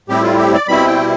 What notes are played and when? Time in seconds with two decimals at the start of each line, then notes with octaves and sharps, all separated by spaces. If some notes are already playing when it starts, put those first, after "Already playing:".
0.08 A2 G3 C4 E4 G4
0.23 F4
0.38 G4
0.54 D5
0.68 B2 G3 C4 E4 B5
0.87 G5